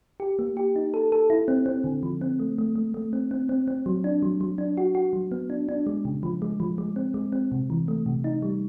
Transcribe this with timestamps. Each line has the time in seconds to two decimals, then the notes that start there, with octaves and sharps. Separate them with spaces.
0.20 G4
0.39 A#3
0.57 G4
0.76 D#4
0.94 A4
1.12 A4
1.30 E4
1.48 C4
1.66 C4
1.84 D3
2.03 F3
2.21 C4
2.39 A3
2.58 A3
2.75 A3
2.94 A3
3.13 C4
3.31 C4
3.49 C4
3.68 C4
3.86 F#3
4.04 D4
4.22 F#3
4.41 F#3
4.58 D4
4.77 F#4
4.95 F#4
5.13 F#3
5.32 B3
5.50 D4
5.69 D4
5.87 G#3
6.05 C#3
6.23 F3
6.42 G#3
6.60 F3
6.78 G#3
6.96 C4
7.14 G#3
7.32 C4
7.52 C3
7.70 E3
7.88 A3
8.06 C3
8.24 D#4
8.42 G3